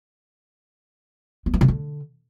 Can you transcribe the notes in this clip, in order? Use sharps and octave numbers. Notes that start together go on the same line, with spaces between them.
B3
E3
C#3
D3